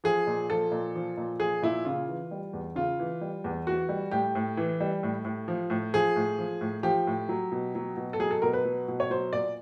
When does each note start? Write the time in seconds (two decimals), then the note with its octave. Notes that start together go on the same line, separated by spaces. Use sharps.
0.04 F3 G#4
0.27 A#2
0.50 F3 A4
0.72 A#2
0.96 F3
1.17 A#2
1.40 F3 G#4
1.62 A#2 E4
1.85 C#3 F4
2.08 E3
2.31 G3
2.53 E2
2.76 C#3 F4
2.99 E3
3.21 G3
3.44 E2
3.67 E3 F#4
3.89 G3
4.11 A2 G4
4.35 A2
4.57 E3
4.80 G3
5.03 A2
5.25 A2
5.48 F3
5.70 A2
5.94 F3 G#4
6.16 A2
6.38 F3
6.61 A2
6.83 F3 G4
7.07 A2
7.29 F#3
7.52 B2
7.75 F#3
7.97 B2
8.13 A4
8.19 F#3 G#4
8.31 A4
8.42 B2 A#4
8.53 B4
8.64 F#3
8.88 B2
9.00 C#5
9.10 F#3 C5
9.32 A#2 D5